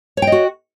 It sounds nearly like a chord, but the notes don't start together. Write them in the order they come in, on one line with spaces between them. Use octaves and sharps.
C#5 G5 D#5 F#4